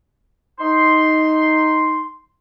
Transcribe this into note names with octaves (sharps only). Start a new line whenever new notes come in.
D#4 C6